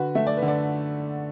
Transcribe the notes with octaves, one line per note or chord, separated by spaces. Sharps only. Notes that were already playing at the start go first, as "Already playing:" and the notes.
Already playing: D3 F#4 B4
A3 E5
D5
B4
D3
A4 D5